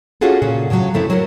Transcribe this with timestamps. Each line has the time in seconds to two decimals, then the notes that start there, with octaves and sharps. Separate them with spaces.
0.21 C#4 F4 F#4 G#4 A4
0.42 A#2 C#3 F#4
0.70 A2 C#3 E3 F#3
0.94 F#2 A3 C4 E4
1.10 F#3 F#4 A4 A#4